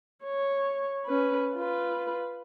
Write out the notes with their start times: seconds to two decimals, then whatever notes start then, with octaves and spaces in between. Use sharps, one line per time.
0.25 C#5
1.06 C#4 B4
1.55 F4 B4